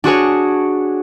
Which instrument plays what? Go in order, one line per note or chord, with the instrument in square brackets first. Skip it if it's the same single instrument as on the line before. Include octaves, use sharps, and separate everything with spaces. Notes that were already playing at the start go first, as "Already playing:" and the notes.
[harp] D4 F#4 G#4 C#5